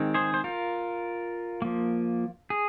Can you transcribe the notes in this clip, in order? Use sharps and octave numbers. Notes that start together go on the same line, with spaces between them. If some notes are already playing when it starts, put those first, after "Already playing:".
Already playing: D#3 G#3 C4
G#4 C5
C5
F4 A#4
F3 A#3
G#4